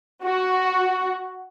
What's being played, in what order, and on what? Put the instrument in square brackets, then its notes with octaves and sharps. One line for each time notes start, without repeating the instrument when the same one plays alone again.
[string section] F#4